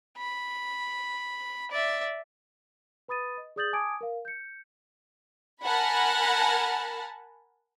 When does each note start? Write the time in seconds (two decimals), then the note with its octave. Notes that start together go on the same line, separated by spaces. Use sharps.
0.17 B5
1.71 D5 E5
3.08 B4 B5 D#6 A6 D#7
3.37 D#5
3.56 G#4 D5 D#6 G6 A6 F#7
3.73 G#5 A5 D6 D#6 G#6 D7
4.01 A#4 F5
4.25 G6 C#7
5.64 A#4 F#5 G#5 A5 B5